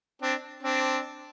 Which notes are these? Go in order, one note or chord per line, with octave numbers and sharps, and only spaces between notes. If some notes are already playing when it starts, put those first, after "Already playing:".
C4 D4
C4 D4